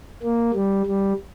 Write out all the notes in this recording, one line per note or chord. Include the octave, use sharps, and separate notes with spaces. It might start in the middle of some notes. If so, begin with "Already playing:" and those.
A#3
G3
G3